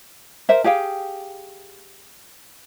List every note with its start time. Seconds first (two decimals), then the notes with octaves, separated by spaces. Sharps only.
0.49 A#4 C5 E5
0.64 G4 G#4 F5 G5